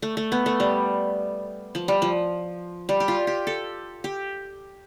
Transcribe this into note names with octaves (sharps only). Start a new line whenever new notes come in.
A3
A3
B3
A3
G3
F3
G3
F3
G3
G4
F4
G4
A4
G4